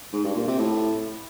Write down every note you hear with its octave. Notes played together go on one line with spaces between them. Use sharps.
G#2
G2
A#2
C3
A2